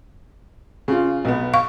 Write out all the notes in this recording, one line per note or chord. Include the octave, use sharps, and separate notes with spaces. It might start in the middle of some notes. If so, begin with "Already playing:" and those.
C#3 F4
B1 B3
F5 C#6